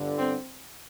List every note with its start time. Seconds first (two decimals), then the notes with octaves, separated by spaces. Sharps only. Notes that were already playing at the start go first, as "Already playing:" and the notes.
Already playing: G1 G2 D3
0.18 C4